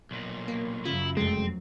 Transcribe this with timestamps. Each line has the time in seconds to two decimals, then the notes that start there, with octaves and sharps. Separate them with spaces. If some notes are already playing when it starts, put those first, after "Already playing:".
0.11 B1 A#2
0.48 A#3
0.85 F#2 C#3 E4 F4
1.17 F1 F2 G#3 A3 C4